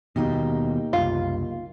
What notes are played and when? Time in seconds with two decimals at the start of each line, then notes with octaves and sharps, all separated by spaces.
0.16 D#2 B2 A#3 D#4 G4
0.93 F#1 C2 F4